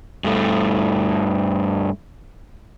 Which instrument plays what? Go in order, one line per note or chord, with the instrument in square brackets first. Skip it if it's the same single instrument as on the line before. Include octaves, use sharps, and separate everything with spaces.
[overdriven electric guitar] G2 A3